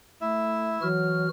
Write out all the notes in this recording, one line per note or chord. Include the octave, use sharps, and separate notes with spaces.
A3 E4 E5
E3 F#3 F#4 F6